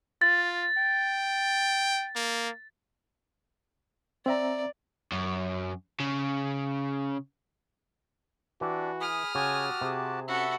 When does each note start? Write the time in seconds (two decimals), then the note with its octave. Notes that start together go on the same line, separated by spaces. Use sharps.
0.22 F4 A6
0.78 G5
2.16 A#3
4.26 C4 D5 E5 A#5
5.12 F#2
6.00 C#3
8.61 E3 D4 F#4 G4
9.01 G#4 B5 D#6 F6
9.35 C#3 F#4 G4 G#5 A5
9.81 C3 G#4
10.28 C#4 F#4 A4 E5 B5